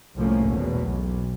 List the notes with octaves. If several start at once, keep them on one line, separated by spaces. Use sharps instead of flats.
C2 A2 F3 A3 A#3 C#4
G#1 E2 B2
B1